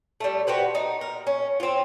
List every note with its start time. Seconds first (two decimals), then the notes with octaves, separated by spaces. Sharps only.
0.20 G3 A3
0.47 F#4 G4 B4 C5
0.75 D#4
1.01 A#4
1.27 C#4
1.60 C4 F4